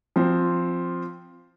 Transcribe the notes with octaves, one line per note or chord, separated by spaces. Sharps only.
F3 C4